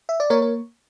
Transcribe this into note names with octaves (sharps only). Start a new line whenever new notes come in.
E5
D5
A#3 A#4 C#5
A#4